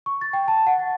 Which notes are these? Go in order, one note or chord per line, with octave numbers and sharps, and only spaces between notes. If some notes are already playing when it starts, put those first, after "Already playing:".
C#6
A6
G5
A5
F#5
A6